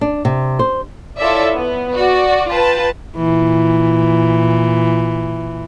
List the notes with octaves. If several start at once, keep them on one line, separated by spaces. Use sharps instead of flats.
D4
C3
C5
E4 F4 A4 C#5 D5 E5
B3
F#4 D5
F4 B4 G5 A5
A#2 E3